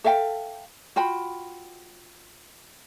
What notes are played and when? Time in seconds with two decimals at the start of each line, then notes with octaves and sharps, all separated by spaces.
0.04 A4 E5 F5 G5
0.96 F4 F#4 G5 B5